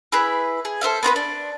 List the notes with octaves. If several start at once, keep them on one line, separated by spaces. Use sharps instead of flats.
E4 G#4 B4
G#4
A4 C5 E5 F5
B3 C4 F#4 B4
D4